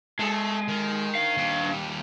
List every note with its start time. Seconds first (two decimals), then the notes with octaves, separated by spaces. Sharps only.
0.19 G#3 A3 A4
0.68 D#3
1.15 D4 F5
1.37 D#2 G3